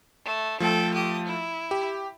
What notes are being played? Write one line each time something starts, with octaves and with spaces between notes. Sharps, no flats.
A3
F3 A3 A4 G5
G4 D#6
E4
G4